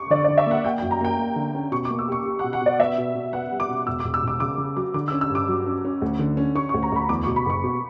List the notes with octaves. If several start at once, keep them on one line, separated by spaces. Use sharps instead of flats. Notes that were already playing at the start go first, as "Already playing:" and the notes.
Already playing: C#6 D6
D3 D5
D5
D3
E5
A#3 F#5
A#3 G5
G5
F#2
A#5
A#3 G5
A#3
D3
C#4
B2 C#6
D6
A#3
E6
G4 C#6
G4
F#5
B2
F#5
B2 D5
B3 E5
B2
B2
B3 F#5
G3
D6
B2
E1 E6
D6
E1
E6
E1 D6
C#3 D6
C#3
F#3 D6
D3 D6
E6
C#4
E6
G2
D6
F#3
C#4
C#4
D2
D3
C#4
C#4 C#6
C#6
D2
A#5
D2 B5
E2 D6
C#6
B2
B5
F#1 C#6
B2